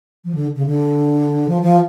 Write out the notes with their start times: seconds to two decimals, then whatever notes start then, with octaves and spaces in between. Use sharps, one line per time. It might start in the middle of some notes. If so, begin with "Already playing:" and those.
0.25 F3
0.35 D3
0.56 C#3
0.66 D3
1.49 F3
1.62 F3